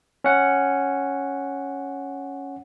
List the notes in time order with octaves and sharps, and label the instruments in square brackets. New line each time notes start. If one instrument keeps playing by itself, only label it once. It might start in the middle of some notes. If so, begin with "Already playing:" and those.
[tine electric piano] C#4 F#5